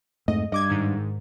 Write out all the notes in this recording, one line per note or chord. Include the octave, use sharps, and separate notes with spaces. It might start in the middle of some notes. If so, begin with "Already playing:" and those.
F2 G#2 A3 D#5
G2 D#5 D6 G#6
G#2 D#3